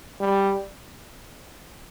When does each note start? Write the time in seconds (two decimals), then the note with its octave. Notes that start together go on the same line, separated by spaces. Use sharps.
0.20 G3